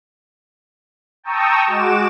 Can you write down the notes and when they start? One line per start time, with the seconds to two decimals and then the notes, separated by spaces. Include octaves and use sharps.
1.24 G5 A5 A#5 C#6 D#6 E6
1.67 G#3 F#4 D6 E7